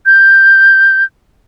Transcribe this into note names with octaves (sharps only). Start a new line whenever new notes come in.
G6